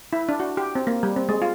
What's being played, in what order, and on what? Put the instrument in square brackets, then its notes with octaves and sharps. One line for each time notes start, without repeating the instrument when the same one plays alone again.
[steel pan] E4
D4
F#4
G4
C4
A#3
G3
C4
G#3
F4